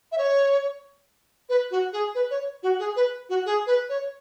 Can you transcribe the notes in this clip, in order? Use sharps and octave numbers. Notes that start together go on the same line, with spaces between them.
E5
C#5
B4
F#4
G#4
B4
C#5
F#4
G#4
B4
F#4
G#4
B4
C#5